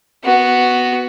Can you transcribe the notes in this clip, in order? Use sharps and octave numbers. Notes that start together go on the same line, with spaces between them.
B3 F#4